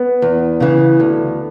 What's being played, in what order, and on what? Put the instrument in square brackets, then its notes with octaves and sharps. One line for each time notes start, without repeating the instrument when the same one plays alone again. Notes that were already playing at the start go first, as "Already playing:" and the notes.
Already playing: [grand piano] B3
[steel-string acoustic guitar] E2
C#3 E3
D2